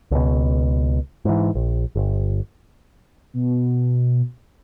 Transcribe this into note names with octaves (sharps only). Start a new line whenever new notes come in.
C#2 B2
G#2 E3
A#1
G1
B2